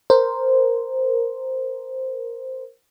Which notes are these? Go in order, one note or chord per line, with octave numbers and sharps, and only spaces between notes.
A#4 C5